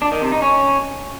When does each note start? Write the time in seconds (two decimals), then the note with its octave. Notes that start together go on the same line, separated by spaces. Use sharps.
0.02 D4
0.12 D#3
0.22 C3
0.32 D#4
0.42 C#4